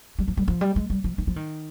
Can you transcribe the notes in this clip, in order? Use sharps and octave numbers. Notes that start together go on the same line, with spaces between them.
G3
F3
G3
F3
G3
G#3
G3
F3
D#3
F3
D#3